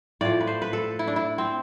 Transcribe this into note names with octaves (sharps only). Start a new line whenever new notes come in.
A2 F3 D5
B4
C5
B4
A4
E4
D4
E4
C4